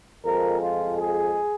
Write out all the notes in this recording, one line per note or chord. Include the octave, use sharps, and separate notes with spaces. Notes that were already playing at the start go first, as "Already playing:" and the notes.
F2 F3 G#3 A#4
F4
G#4